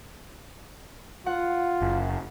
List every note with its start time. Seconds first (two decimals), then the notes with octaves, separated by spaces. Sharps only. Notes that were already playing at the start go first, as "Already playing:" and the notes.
1.26 F4 F#5
1.82 F#1